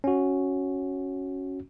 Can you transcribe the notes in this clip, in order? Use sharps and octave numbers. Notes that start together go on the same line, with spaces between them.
C#4 F#4